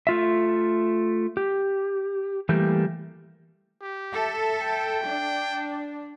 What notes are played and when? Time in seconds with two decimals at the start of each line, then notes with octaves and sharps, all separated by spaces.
0.07 A3 F4 E5
1.37 G4
2.49 E3 G3 A3 A#3 G4
3.81 G4
4.13 A4 E5
4.60 G5
5.05 D4